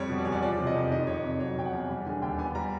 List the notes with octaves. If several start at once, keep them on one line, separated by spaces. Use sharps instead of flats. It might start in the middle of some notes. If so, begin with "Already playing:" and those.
Already playing: F2 G3 C#5
B2
D5
E2 C#5
D5
F3 D5
C3
D#5
F2
D#3 D#5
C3 C#5
D5
F2
F#3 C#5
B2 G5
F#5
E2
G3
D3 G#5
D#2 G5
B3 G#5
G3 A#5